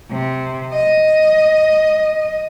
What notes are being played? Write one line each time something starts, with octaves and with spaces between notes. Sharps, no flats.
C3
D#5